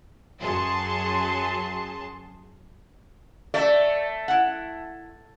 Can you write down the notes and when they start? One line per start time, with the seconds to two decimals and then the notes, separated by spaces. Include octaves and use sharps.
0.40 F#2 F#3 G#4 A5 C6
3.54 A3 D5 E5
4.28 E4 F#5